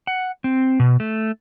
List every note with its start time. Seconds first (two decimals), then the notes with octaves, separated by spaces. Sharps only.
0.07 F#5
0.44 C4
0.80 B2
1.00 A3